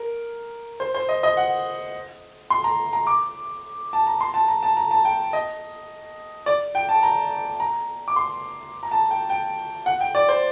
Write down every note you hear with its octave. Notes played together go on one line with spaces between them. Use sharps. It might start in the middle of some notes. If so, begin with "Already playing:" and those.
Already playing: A#4
C5
C5
D#5
D#5
F#5
C6
A#5
A#5
D6
A5
A#5
C6
A5
A#5
A5
A#5
A5
G5
D#5
D5
G5
A5
A#5
A#5
D6
C6
A#5
A5
G5
G5
F#5
G5
D5
C5